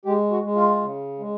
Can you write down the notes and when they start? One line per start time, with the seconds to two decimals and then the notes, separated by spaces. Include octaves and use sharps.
0.05 G#3 G4
0.31 F#4
0.44 G#3
0.55 F4
0.81 C#3
1.19 G#3